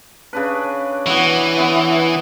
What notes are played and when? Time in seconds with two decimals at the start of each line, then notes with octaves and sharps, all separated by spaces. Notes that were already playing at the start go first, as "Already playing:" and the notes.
0.33 C#3 D4 B4
1.06 E3 B3 F#4
1.59 B3